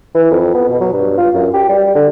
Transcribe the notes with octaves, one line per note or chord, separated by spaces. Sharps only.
E3
F2
B3
B2
F#3
G2
F4
F#2
G4
G3
D3